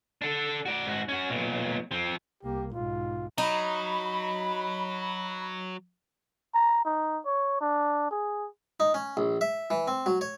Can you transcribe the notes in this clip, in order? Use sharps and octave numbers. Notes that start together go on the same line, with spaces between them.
D4 A4
F#4 D5
G#2 F#4
C#4 F#4
B1 A#2
F3 C4
C2 A#3 G4
B1 G#2 F4
F#3 D#4 B5
A#5
D#4
C#5
D4
G#4
D#4
C#4
A#1
E5
E3
C4
F#3
C#5